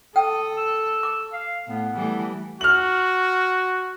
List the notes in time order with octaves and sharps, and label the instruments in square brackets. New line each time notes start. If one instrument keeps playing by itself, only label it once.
[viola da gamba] A4 [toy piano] G5 [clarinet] D#6
[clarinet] E6
[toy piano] D6
[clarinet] F5
[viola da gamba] A2 [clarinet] B3
[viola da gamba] E3 G3 A3
[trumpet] F#4 [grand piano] F6 F#7